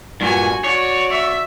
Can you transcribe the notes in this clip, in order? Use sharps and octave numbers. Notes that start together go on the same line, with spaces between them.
G2 A#2 F#4 G#5
F#4 C#5 D5
E5